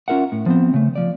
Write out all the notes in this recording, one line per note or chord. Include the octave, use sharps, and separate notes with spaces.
C#4 F4 A#4 E5 F#5
A2
F3 B3 C4
C#3 A3
F3 D5